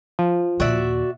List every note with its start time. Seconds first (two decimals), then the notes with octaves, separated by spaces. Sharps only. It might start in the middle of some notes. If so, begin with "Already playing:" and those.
0.19 F3
0.60 D#2 A#2 F#4 D5 E5